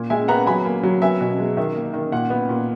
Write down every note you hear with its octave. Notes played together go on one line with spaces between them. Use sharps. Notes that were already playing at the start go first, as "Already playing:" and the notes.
Already playing: A#2
G#3 E5 G#5
B3 F#5 A#5
F#3 G#5 B5
A#3
F#3
B3 E5 G#5
B2
G#3
D#3 E5
A#3
D#3
A#2 F#5
B3
A#2